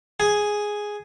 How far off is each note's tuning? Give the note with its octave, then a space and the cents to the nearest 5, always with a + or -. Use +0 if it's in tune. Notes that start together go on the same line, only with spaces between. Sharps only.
G#4 +0 G#5 +0